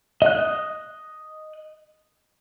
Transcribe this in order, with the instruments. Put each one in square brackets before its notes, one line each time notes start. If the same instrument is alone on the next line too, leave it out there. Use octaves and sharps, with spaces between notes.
[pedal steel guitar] D#5 F#6